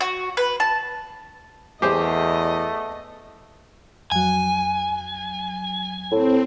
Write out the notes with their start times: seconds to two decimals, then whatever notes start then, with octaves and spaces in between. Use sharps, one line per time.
0.01 F#4
0.37 B4
0.60 A5
1.82 E2 A3 G4 G#4 C5 D#5
4.12 F2 F#3 G#5
6.12 A2 C4